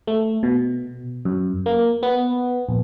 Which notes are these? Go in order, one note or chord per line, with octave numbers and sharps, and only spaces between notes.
A3
B2
F#2
A#3
B3
A#1